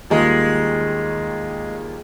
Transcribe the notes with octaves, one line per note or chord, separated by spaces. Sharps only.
D#2 D#3 G3 G#3 A#3 F4